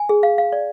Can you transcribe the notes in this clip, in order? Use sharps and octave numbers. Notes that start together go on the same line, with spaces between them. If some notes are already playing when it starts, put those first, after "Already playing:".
Already playing: G#5
G#4
F5
F5
D5